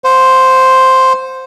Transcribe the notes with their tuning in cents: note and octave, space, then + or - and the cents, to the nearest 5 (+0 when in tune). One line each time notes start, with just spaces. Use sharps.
C5 +0 F#5 -45